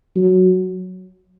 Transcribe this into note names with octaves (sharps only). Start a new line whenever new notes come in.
F#3